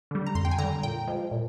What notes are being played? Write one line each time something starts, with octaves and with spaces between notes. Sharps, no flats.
D3 G3
A#5
F2 C6
G5
G#5
D3 A#5
G3
A#2 G5
F3 G#3
A#2